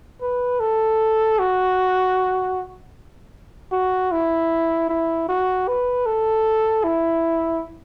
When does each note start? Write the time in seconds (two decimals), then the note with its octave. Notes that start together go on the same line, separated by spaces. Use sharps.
0.22 B4
0.60 A4
1.39 F#4
3.72 F#4
4.12 E4
4.89 E4
5.29 F#4
5.68 B4
6.06 A4
6.84 E4